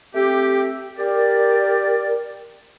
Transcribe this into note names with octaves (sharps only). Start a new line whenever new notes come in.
A3 C4 G4
G4 A#4 D5